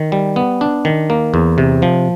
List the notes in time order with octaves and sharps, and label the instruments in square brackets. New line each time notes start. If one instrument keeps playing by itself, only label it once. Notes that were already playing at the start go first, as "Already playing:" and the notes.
Already playing: [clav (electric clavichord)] D#3
G3
B3
D4
D#3
A#3
E2
C3
F3